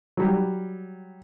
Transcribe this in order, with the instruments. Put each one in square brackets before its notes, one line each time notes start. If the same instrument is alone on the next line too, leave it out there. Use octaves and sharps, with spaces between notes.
[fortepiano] F#3 G3